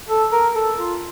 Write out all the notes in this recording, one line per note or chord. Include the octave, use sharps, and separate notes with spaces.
A4
A#4
A4
F4